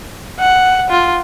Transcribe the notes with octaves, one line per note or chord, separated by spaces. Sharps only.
F#5
F4